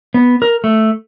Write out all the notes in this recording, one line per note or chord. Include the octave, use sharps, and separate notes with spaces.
B3
A#4
A3